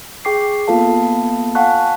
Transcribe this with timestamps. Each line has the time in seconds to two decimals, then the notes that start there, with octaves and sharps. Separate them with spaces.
0.25 G#4 G5 C#6 D6 C7
0.68 A#3 B3 F4 A4 F5 A5
1.55 F5 F#5 G#5 A5 C#6 F#6